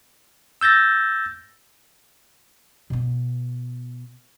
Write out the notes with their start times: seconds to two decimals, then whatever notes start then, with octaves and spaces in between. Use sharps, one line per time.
0.61 E6 G6 A6 A#6
2.90 B2 B3